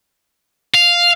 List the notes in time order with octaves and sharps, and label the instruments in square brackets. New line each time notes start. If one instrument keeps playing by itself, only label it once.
[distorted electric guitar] F5